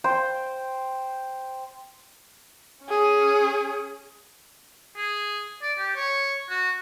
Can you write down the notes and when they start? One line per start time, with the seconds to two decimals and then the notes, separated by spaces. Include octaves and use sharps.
0.04 C5 G5
2.85 C#4 G#4
4.97 G#4
5.62 D5
5.78 G4
5.96 C#5
6.50 F#4